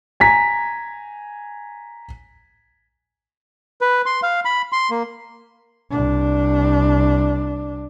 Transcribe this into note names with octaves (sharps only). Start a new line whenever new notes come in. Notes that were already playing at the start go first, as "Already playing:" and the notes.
G#5 A#5 B6
B4
C6
F5
B5
C6
A#3
C2 D4